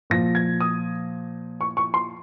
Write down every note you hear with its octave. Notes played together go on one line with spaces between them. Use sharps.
A#2 F3 A#6
G#6
D#6
C#6
C#6
C6